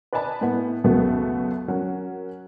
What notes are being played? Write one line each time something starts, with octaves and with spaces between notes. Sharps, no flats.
B4 D5 D#5 G#5 A5 B5
A2 B3
C#2 F#2 B2 F#3 A3 B3
F#3 C#4 F#4 A#4